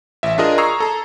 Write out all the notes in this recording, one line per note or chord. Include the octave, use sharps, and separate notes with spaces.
A1 E5
D4 F4 G#4 A#4 D#5
A#5 C#6 D#6 E6 G#6 C7
A4 A#5